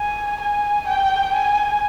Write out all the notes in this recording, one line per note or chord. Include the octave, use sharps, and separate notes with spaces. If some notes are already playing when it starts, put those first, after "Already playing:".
Already playing: G#5
G#5
G5
G#5